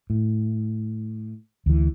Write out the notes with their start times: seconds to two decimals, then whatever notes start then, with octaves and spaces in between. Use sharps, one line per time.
0.10 A2
1.66 D2 E3